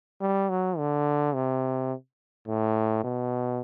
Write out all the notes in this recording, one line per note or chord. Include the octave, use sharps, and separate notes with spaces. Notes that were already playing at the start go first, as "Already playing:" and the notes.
G3
F#3
D3
C3
A2
B2